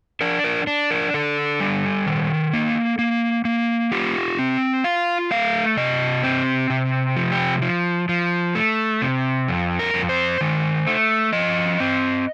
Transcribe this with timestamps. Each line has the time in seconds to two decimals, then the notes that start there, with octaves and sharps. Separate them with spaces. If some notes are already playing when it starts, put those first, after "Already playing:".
0.21 D4 A#4
0.44 A#4
0.67 D4
0.91 A#4
1.14 D3 A4
1.60 G3
2.07 D#3
2.54 A#3
2.99 A#3
3.45 A#3
3.92 F4 G4
4.39 C4
4.84 F4 F5
5.31 A3 F5
5.77 C3 D#5
6.24 C4
6.70 C3
7.17 F3
7.32 G4
7.62 F3
8.09 F3
8.55 A3
9.02 C3
9.48 F2
9.79 A#4
9.94 F2
10.09 C5
10.41 D#3
10.87 A3
11.33 F3 D#5
11.80 C4